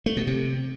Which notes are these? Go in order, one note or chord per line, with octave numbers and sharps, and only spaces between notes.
A3
B2
C3